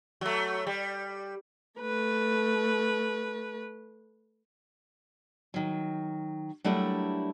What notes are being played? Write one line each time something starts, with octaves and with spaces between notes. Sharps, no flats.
F#3 A3
G3
A3 B4
D#3 F#3
F#3 G3 A3 A#3 D4 E4